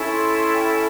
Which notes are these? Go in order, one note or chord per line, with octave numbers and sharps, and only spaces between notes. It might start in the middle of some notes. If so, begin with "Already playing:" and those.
Already playing: C#4 E4 A4
C6
C6
G5
G#5